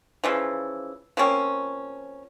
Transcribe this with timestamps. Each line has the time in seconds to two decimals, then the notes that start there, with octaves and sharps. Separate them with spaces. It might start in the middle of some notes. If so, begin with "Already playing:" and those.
0.24 C#3 E3 F3
1.17 F3 A#3 C4 C#4